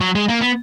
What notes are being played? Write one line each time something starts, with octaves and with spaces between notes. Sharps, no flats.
F#3
G#3
A#3
B3